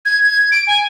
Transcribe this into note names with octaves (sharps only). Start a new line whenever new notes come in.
G#6
G#6
D7
G#5